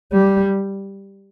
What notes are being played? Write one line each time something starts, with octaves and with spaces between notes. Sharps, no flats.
G3